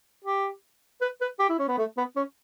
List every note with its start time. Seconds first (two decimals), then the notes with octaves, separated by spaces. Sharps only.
0.24 G4
1.01 B4
1.21 B4
1.39 G4
1.49 E4
1.59 C#4
1.68 B3
1.78 A3
1.97 B3
2.16 C#4